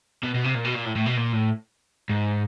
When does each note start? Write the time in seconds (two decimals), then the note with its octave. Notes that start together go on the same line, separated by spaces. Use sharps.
0.23 B2
0.34 B2
0.44 C3
0.55 A#2
0.65 B2
0.75 A#2
0.85 A2
0.96 A2
1.06 B2
1.17 A#2
1.33 A2
2.09 G#2